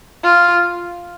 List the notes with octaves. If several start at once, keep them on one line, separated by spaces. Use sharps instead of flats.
F4